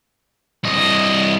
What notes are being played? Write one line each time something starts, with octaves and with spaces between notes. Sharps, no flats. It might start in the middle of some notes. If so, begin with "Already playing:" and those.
C2 D#5